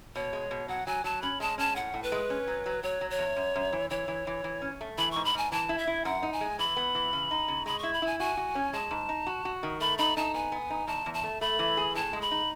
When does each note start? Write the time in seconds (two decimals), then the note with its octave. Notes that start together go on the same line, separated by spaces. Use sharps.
0.15 B2 C#5
0.33 G#3
0.51 B2
0.68 F#3 F#5
0.87 F#3 G#5
1.04 F#3 A5
1.22 C#4 B5
1.40 G#3 A5
1.58 C#4 A5
1.76 A2 F#5
1.94 A2
2.03 B4
2.12 G#3
2.30 C#4
2.47 F#3
2.66 F#3
2.83 F#3 C#5
3.01 F#3
3.10 C#5
3.19 E2
3.36 F#2
3.56 F#2
3.73 E3
3.90 E3 C#5
4.08 E3
4.27 E3
4.44 E3
4.62 C#4
4.81 A3
4.98 E3 B5
5.11 G#2 C#6
5.25 B5
5.34 G#2 G#5
5.52 E3 A5
5.69 E4
5.78 E5
5.87 E4
6.05 F#2 F#5
6.23 D#4
6.33 G#5
6.41 G#3
6.59 E3 B5
6.77 B3
6.95 E3
7.13 C#3
7.31 D#4
7.48 C#3
7.66 G#3 B5
7.79 E4 C#6
7.93 B5
8.02 E4 G#5
8.20 F#4 G#5
8.37 F#4
8.55 C#4
8.73 G#3 A5
8.91 G#2
9.09 D#4
9.27 F#4
9.45 F#4
9.63 D#3
9.81 A3 B5
9.98 D#4 B5
10.17 D#4 A5
10.34 B3 G#5
10.52 B3
10.70 D#4
10.87 E2 A5
11.06 E2
11.14 A5
11.24 A3
11.41 A3 B5
11.59 E3
11.77 G#4
11.95 A2 A5
12.13 G#3
12.22 B5
12.31 D#4